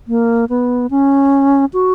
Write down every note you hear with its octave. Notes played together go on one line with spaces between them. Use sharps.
A#3
B3
C#4
F#4